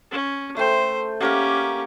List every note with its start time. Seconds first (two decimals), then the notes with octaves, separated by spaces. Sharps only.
0.11 C#4
0.57 A3 C5 G5
1.20 A#3 C#4 G4 A#4 F#5